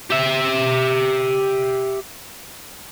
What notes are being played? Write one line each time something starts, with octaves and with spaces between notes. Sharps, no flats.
G4 E5